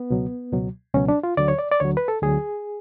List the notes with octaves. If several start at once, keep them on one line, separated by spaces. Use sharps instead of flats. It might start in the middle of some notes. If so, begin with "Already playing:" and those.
Already playing: B3
C#2 B2 F#3
C#2 B2 F#3
C#2 B2 F#3 C#4
D4
F4
D2 D3 F#3 D5
C#5
D5
D5
D2 D3 F#3 C#5
B4
A4
D2 D3 F#3 G#4